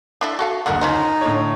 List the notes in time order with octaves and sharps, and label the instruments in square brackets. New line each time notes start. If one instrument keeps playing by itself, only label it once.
[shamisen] D4 E4 A4
F#4 A4 F5
[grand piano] F#1 D2 F#5 [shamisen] D3 D4 A#4
[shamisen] C#4 F4 C5 [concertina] D#4 [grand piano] C6
[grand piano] A2 D3 C#5